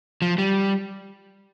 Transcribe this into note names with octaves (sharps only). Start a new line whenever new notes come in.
F3
G3